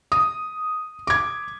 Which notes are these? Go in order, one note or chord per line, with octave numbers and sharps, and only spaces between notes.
D#6
D6 G#6